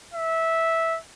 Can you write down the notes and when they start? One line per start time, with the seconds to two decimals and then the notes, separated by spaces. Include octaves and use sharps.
0.14 E5